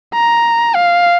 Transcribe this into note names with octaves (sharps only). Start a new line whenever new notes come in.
A#5
F5